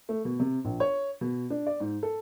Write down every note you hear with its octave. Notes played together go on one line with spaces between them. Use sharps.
A3
B2
C3
A#1
C#5
B2
D4
D5
G#2
A4